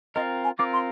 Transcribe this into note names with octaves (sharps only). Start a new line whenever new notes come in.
C4 F4 A#4 D#5
G#5
C4 F4 A#4 D6
C6